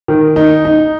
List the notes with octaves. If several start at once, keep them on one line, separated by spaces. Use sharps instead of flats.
D#3
D#4
D#4